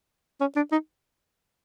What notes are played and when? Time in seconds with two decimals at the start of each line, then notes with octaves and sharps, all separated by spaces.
0.41 C#4
0.56 D4
0.72 D#4